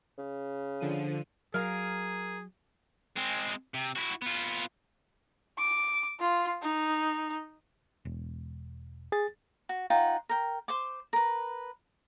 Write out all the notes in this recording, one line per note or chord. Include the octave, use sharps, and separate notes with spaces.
C#3
D3 F3 D#7
F#3 G#4 A#4 F5 A#5
G#3 C4
C3
E4 F#4
B3 F4
D6
F4
D#4
E1
G#4 A6
F#4
D#4 F4 F#5 G5
A#4 G5
C5 C6 D6
A#4 B4